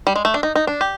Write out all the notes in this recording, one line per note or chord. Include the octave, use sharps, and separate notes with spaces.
G3
G#3
A3
D4
D#4
D#4
D4
G4